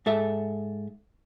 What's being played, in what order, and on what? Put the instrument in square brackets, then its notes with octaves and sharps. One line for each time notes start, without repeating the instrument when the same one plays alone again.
[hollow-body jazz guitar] G#2 A4 E5